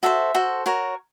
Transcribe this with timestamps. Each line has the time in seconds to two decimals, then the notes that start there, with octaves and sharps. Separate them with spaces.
0.03 F#4 A4 C5 E5
0.35 F#4 A4 C5
0.66 F#4 A#4 C#5